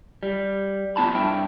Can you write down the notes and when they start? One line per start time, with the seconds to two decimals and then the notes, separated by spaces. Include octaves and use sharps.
0.23 G3
0.96 F3 B3 E4 A5 B5
1.15 G2 E4 G5